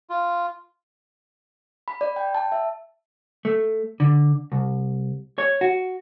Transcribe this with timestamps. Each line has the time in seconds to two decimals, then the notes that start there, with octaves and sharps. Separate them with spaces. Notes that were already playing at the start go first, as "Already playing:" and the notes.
0.10 F4
1.88 B5
2.01 D5
2.16 G5
2.35 A5
2.52 E5
3.45 A3
4.00 D3
4.52 C2
5.38 C#5
5.61 F#4